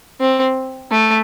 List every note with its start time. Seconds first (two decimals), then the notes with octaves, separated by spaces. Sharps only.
0.20 C4
0.92 A3